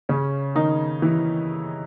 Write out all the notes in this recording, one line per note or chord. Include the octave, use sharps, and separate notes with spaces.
C#3 C#4
D#3 D#4
E3 E4